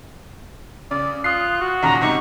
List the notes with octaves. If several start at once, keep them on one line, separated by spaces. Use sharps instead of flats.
C#3 D5
F4 D#6 F#6 C7
F#4
D#2 A#2 C#3 A#5
G#2 C3 D#4 C#6